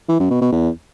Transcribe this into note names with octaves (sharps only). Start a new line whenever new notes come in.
E3
F#2
B2
B2
E2